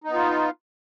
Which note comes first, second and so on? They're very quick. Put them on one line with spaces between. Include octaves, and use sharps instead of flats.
D#4 B3 F4